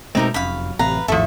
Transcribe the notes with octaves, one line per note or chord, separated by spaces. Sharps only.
B2 G#3 A3 C4 D#4 A#4
F1 F#2 F5 B5
A1 A2 C3 B4 F5 A#5
G#1 E2 A2 F3 A4 E5 C#6